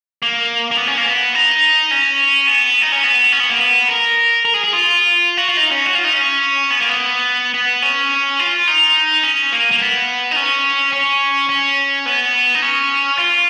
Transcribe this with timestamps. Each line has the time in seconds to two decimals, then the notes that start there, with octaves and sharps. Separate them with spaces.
0.22 A#3
0.71 A#3
0.78 B3
0.87 C#4
0.98 A#3
1.06 B3
1.35 D#4
1.91 C#4
2.47 B3
2.82 D#4
2.92 C#4
3.04 B3
3.32 C#4
3.40 B3
3.49 A#3
3.58 B3
3.88 A#4
4.45 A#4
4.54 G#4
4.64 G#4
4.73 F4
5.37 F#4
5.48 F4
5.57 D#4
5.71 C#4
5.86 F#4
5.95 F4
6.04 D#4
6.13 C#4
6.70 B3
6.80 A#3
6.89 B3
7.54 B3
7.82 C#4
8.39 F4
8.68 D#4
9.23 C#4
9.52 A#3
9.71 A#3
9.81 B3
10.31 D#4
10.36 C#4
10.93 C#4
11.49 C#4
12.06 B3
12.55 D#4
12.62 C#4
13.18 F4